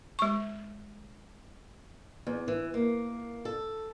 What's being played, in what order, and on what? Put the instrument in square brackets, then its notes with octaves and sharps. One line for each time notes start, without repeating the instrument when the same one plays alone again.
[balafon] G#3 C#6
[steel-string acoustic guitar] E2
E3
A#3
A4